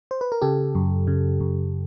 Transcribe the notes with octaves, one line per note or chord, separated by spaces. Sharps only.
C5
B4
A#4
C#3 G4 A4
F#2
C#3
F#2